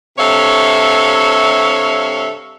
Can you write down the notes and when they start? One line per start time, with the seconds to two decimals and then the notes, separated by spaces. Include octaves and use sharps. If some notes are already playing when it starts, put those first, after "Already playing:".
0.18 G2 C3 A4 C#5 E5 F5